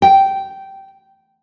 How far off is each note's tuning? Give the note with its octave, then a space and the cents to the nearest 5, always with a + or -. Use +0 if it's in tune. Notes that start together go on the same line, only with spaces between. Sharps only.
G5 -10